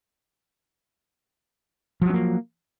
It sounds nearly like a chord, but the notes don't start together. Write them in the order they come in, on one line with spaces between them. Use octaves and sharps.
F3 F#3 C#4 A#3